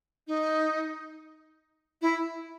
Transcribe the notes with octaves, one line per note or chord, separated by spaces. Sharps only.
D#4
E4